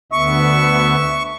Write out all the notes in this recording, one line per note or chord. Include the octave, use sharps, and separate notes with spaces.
D2 D3 B3 E5 C#6